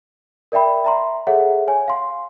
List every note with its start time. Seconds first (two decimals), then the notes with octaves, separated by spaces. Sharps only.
0.52 A#4 D5 E5 G5 B5
0.84 E5 A#5 C6
1.27 G#4 A4 C#5 E5 F#5
1.67 C#5 G#5
1.88 F5 C6